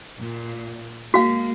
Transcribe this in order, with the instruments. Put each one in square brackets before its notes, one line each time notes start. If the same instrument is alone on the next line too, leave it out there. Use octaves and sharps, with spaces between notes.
[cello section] A#2
[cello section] G#3 A#3 [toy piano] F#4 F5